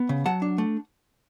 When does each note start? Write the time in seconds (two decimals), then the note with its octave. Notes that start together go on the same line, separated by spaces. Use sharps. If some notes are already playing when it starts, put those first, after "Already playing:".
Already playing: B3
0.09 C#3
0.26 F#3 F#5 A5
0.42 D4
0.58 A3